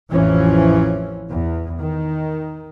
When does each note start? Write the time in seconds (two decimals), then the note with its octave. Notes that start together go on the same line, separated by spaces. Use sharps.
0.11 A1 F2 E3 F3 C#4
1.30 E2
1.78 D#3